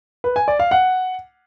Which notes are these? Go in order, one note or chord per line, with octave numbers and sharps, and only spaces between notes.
B4
G#5
D5
F5
F#5